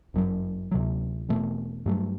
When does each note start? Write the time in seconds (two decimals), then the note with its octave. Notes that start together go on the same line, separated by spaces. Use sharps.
0.14 G1 F#2 D3 F#3
0.71 D2 C3 F#3
1.29 E1 E2 B2 A3
1.86 G2 F#3 A3